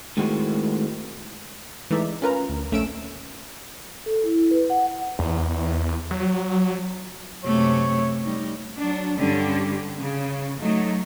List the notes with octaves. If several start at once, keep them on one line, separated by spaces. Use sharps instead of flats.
A2 D#3 G#3 C4 F#4
E3 G#3 A3 D#4 D5 E5
C#4 F4 A#4 B4 A#5
D2
A#1 A3 C#4 E6 D7 E7
A4
E4
B4
F#5
E2
F#3
F#2 C3 A3 C#5
G3 D#4
F#3 D4
G2 D3 G3 C#4 G4
C#3
F#3 A3 D#4